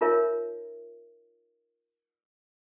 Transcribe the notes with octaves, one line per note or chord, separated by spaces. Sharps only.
D#4 F4 A#4 C#5 E5